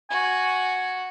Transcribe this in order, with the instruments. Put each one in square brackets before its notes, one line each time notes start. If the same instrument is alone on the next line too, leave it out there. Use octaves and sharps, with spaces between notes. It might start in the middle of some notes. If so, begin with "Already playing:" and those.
[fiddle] F#4 [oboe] G#5